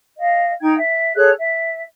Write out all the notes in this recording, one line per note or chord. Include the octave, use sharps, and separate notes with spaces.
D#5 F5
D#4 G5 G#6
E5
G#4 A4 C#5 F#6
E5